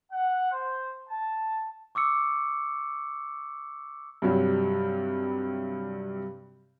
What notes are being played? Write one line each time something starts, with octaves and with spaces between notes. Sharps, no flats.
F#5
C5
A5
C#6 D6 E6 C#7
G2 C3 F#3 G3